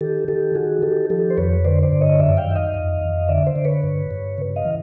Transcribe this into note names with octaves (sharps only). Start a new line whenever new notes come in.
D#3 G4 A4
D#3 G4 A4
D#3 F#4 G#4
D#3 G4 A4
F3 G4 A4
C5
F2 B4 C#5
D3 C5 D5
C5 D5
G2
C#5 D#5
F#2 D5 E5
F5 G5
D#3 E5
D#5 F5
F2
F2
D3 D5 E5
C5 D5
D3
B4 C#5
G2
G2
C#3
D#5 F5
E3